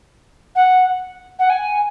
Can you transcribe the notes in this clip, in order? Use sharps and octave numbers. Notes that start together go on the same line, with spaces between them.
F#5
F#5
G#5